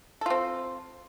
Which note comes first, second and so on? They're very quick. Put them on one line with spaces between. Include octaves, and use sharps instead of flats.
A4 F4 C4